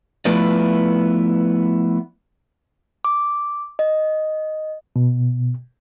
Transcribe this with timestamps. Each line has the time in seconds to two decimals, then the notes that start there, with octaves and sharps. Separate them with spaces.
0.25 F3 A3 B3 E4 B4 D5
3.05 D6
3.79 D#5
4.96 B2